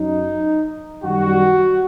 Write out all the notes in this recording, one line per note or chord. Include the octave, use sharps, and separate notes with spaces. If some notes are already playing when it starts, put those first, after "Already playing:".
Already playing: F#2 F#3 D#4
F#2 D#3 G3 F#4